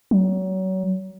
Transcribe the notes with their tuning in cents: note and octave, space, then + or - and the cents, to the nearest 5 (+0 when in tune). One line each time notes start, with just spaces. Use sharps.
F#3 +30